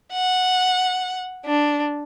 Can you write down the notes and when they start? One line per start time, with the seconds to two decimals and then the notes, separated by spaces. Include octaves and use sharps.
0.13 F#5
1.45 D4